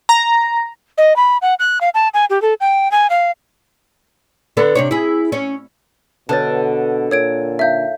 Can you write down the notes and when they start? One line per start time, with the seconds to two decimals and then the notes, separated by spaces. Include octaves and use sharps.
0.09 A#5
0.98 D#5
1.16 B5
1.42 F#5
1.59 F#6
1.81 F5
1.94 A5
2.14 G#5
2.30 G4
2.42 A4
2.60 G5
2.91 G#5
3.10 F5
4.57 D3 B3 A4
4.75 C3 D4 C#5
4.91 E4 G#4
5.32 C#4
6.29 B2 D3 D4 B4 C#5 A5 A6
7.11 A#2 A#4 C#5 G#6 D7
7.59 D#4 E5 F5 G6